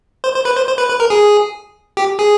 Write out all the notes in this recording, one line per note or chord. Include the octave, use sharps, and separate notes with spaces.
C5
C5
B4
C5
C5
B4
B4
A#4
G#4
G4
G#4